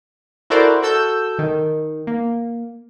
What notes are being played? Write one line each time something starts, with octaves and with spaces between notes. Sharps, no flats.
E4 F#4 A4 A#4 C5 D5
F#4 A4 E6 G6
D#3
A#3